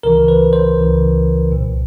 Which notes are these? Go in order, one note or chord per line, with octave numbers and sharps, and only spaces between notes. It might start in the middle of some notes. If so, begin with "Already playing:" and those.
C#2 C#3 E3 A#4
B4
C5
C#2 C#3 E3
C2 A#2